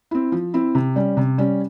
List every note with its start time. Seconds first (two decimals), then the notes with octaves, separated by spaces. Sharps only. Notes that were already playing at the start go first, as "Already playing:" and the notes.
0.11 C4 E4
0.32 F3
0.54 C4 E4
0.75 C3
0.96 G3 C#4
1.17 C3
1.38 G3 C#4